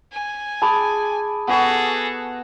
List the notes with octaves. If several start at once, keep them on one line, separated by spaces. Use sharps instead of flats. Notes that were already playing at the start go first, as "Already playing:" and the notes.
G#5
G#4 A5 B5 D6
B3 F#4 G#4 A4